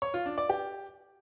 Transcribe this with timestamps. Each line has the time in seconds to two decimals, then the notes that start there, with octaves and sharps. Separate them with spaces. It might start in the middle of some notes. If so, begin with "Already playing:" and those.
0.02 C#5
0.14 F4
0.26 D4
0.38 D5
0.49 G4